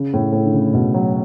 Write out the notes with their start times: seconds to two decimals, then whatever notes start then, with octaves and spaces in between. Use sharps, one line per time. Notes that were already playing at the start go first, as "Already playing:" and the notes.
Already playing: C#3
0.13 A2
0.33 A2
0.45 D3
0.53 C#3
0.74 B2
0.94 F#3